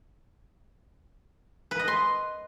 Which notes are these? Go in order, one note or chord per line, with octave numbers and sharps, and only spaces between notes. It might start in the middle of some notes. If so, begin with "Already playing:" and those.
B4
D#5
C6